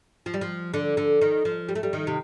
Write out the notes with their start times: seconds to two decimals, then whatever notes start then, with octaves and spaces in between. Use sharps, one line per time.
0.26 F3
0.34 G3
0.41 F3
0.74 D3
0.97 D3
1.21 D#3
1.45 F3
1.69 G3
1.75 A3
1.83 G3
1.93 D#3
2.07 C3